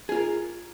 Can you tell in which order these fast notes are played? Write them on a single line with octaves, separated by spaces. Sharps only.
G#4 F4 A#4